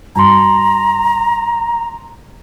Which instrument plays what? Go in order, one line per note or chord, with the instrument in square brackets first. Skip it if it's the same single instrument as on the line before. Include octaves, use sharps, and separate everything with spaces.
[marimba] G2 G3 [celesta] A5 C6 [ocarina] A#5